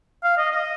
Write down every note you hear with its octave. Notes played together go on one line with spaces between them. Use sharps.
F5
D#5
D#5